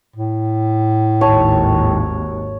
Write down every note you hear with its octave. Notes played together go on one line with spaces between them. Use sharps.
A2
G#1 D#2 G#2 C#5 A5